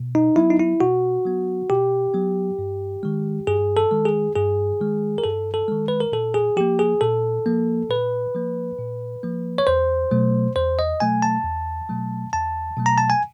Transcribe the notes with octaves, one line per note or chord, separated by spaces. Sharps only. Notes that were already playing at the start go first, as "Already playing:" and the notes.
Already playing: B2
D#4
F#3 B3 E4
D#4
E4
B2 F#4
F#3 B3
B2 G4
F#3 B3
G2
D#3 G#3
G2 G#4
A4
D#3 G#3
G#4
G2 G#4
D#3 G#3
A#4
G2 A4
A4
D#3 G#3
B4
A#4
A#2 A4
G#4
F3 A#3 G4
G#4
A#2 A4
F3 A#3
A#2 B4
F3 A#3
A#2
F3 A#3
C#5
E2 C5
B2 F#3 A3
E2 C5
D#5
B2 F#3 A3 G#5
A5
E2
B2 F#3 A3
E2 A5
B2 F#3 A3
A#5
A5
G#5